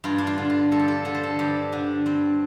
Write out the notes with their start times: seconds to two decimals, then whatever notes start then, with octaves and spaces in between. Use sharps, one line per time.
0.04 G2 F4
0.18 D4
0.27 F4
0.38 D3
0.50 F4
0.72 G2 A4
0.79 G4
0.88 A4
1.05 D3 A4
1.14 C5
1.23 A4
1.39 G2 G4
1.72 D3 D4
2.06 G2 C4